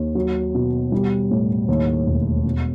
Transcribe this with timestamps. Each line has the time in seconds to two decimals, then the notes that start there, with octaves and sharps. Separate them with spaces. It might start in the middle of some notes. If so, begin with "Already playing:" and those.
Already playing: D#2 D#3
0.15 F#3
0.54 B2
0.92 G3
1.31 A2
1.68 D#2
2.07 E1
2.46 B2